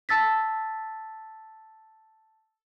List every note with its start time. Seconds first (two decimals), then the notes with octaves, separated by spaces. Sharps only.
0.09 A5 E6 A6 B6